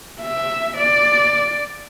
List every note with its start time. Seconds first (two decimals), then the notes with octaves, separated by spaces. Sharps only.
0.21 E5
0.77 D5